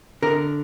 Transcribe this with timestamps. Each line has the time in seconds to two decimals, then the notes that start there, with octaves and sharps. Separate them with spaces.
0.22 D3 A#4